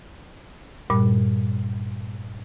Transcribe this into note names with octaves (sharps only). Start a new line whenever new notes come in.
G2 A#2 G3